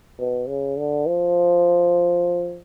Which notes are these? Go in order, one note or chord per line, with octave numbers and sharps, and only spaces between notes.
B2
C#3
D3
F3